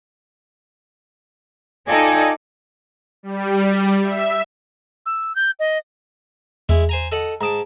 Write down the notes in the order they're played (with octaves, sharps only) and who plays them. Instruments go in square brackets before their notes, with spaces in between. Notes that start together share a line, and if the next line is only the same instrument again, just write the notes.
[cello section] D#4 A4 D5 [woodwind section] F4 G5 G#5
[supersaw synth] G3
E5
[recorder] E6
G6
D#5
[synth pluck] E2 [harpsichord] G#3 E4
[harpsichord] C5 G#5 A#5
A4 D#5 F#5
[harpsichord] G#2 A5 [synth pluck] A#5 D#6 D7